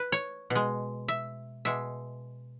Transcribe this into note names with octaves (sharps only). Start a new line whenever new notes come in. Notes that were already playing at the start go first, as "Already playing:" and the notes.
Already playing: B4
C#5
B2
G#3
E5
B2 G#3 E5